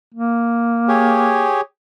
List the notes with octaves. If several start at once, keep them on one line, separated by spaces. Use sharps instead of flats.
A#3
G4 G#4 C#5